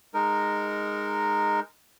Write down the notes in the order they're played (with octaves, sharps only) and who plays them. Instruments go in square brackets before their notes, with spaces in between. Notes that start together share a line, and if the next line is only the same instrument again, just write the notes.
[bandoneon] G#3 D#4 A#4